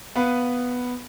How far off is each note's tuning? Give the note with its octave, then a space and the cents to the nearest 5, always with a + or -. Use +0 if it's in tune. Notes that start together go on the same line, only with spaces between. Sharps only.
B3 +0 B4 +0 F5 +0